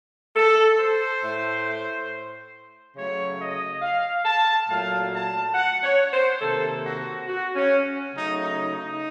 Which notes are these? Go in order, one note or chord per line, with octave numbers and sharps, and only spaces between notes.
A4
C5
A2 A3
C#3 F#3 A3 C#5
D#5
F5
A5
A#2 F#3 A3 F5
A5
F#5
C#5
C5
C3 D#3 A#3 A4
F#4
F#4
C#4
C#3 F#3 A3 D#4
D#4
D#4